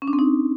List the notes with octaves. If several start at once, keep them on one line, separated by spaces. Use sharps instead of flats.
C#4
D4
C4
D#4